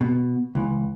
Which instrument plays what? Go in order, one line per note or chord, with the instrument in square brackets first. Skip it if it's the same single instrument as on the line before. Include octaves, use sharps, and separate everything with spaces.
[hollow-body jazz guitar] B2
C#2 E3